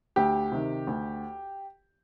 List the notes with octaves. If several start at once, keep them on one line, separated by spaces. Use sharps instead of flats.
D2 G4
C3 D#3
D2